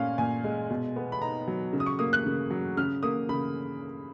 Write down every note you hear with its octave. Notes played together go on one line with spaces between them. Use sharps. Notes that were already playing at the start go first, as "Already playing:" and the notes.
Already playing: A#2 C#4 F5
A#2 G#5
G#3
B2
B3
B5
D#4 A#5
F#3
C#3
D#6
C#6
A#3 D#6
F#6
C#3
F#3
C#3 F6
A#3 D#6
C#3 B5